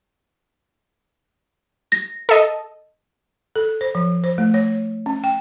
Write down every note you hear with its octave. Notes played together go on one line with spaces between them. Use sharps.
A#6
A4 D#5
A4
C5
F3
C5
A3
C#5
C#4
G5